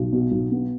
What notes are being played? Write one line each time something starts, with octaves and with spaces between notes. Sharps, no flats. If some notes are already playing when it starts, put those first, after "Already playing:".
Already playing: B1
B2
B1
B3